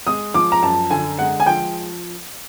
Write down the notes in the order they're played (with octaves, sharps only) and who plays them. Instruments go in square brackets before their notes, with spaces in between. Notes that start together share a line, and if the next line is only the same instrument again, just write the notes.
[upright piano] G#3 D#6
F3 D6
A#5
F#2 A5
D3 G#5
G#3 F#5
G#5
F3 G5